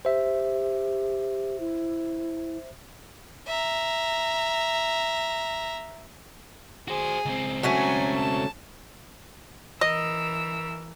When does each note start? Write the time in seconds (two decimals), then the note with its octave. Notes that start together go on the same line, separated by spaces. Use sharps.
0.05 G4 C5 E5
1.60 E4
3.47 E5 A#5
6.88 F#4 G#4 C5
7.26 C#2 C4
7.63 F#3 A3 C#4 F#4 G#5
8.15 A5
9.81 E3 A#4 D#5 E6